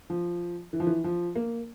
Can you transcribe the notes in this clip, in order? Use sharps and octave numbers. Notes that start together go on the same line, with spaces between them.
F3
E3
F3
E3
F3
A#3